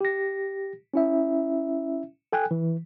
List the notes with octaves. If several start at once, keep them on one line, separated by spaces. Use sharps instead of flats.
G4 A#6
C#4 E4 E5
A4 G5 G#5 F#6
E3